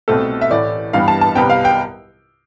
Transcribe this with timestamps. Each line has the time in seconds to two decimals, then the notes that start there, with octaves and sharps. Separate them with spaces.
0.08 C2 B2 A3 C4 A4
0.41 E5
0.50 A1 A2 E3 A3 D5
0.93 G2 E3 G3 B3 F5
1.08 A5
1.21 A5
1.35 C2 C3 G3 B3 G5
1.50 F5
1.65 G5